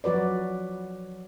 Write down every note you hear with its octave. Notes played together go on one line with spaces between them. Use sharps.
F3 F#3 F#4 B4 D5